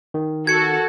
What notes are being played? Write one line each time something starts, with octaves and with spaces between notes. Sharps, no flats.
D#3
F#4 A4 G#6 C#7